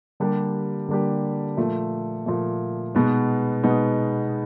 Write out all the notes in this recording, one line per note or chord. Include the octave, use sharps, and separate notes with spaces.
D3 G3 A#3 D4 G4
D3 G3 A#3 D4 G4
A#2 F3 A3
A#2 F3 A3
B2 G#3 B3 D#4
B2 G#3 B3 D#4